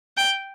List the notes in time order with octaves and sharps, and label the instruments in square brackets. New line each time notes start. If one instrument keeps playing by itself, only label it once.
[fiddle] G5